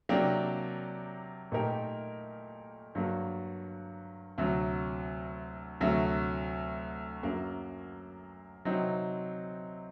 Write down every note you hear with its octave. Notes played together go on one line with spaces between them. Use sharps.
C3 F#3 A#3 D4 G4
A#2 A3 D#4 G4 A#4
G2 F#3 A#3
D2 C3 F#3
D2 C3 F#3 A3
F#2 F#3 A#3
C3 F#3 C4 D#4